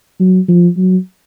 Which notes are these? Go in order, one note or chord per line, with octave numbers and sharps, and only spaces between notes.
F#3
F3
F#3